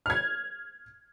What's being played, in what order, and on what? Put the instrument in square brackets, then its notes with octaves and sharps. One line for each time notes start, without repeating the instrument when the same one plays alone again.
[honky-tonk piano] F6 G#6